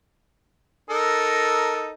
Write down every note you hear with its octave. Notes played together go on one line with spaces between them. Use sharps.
D#4 A4 A#4